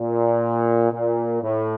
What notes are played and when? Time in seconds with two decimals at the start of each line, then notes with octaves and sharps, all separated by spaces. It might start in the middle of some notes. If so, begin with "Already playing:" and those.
Already playing: A#2
0.92 A#2
1.42 A2